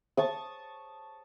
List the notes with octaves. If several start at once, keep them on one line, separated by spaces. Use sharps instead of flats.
A5 C#6 D#6